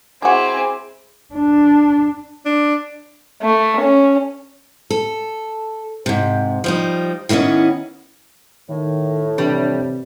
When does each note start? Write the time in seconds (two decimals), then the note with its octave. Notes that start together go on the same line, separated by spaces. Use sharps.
0.22 G#3 C4 E4 F#4 G#4 G#5 D6
1.34 D4
2.46 D4
3.42 A3
3.81 C#4
4.91 A4
6.06 G#2 C3
6.64 F3 G3 D#4
7.29 D#3 E3 A3 B3 C#4
8.70 A2 D#3
9.38 C3 E3 G3 D4 B4